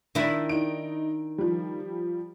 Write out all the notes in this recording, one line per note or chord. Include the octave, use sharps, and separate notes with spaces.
D#3 D4 E4
D#4 D7
F3 G3